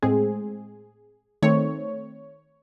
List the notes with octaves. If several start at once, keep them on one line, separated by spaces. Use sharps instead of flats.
A2 G#3 C4 G#4
D#3 A3 C4 C#5